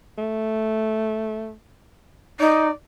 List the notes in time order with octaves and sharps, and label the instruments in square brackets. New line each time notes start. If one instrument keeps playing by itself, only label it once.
[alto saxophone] A3
[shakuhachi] D#4 [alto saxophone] D5